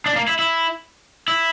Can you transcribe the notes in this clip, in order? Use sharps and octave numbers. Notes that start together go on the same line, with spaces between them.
D4
A#3
E4
E4
E4